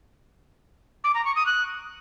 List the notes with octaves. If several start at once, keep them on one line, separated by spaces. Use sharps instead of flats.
D6
A#5
C#6
D#6
F#6